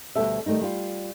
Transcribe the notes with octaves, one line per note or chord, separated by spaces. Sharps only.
D2 B2 D#3 G3 A4 E5
D#3 G3 A3 A#3 D#4
G3 F4